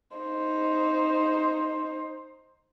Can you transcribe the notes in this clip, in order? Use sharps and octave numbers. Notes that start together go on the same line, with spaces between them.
D#4 C5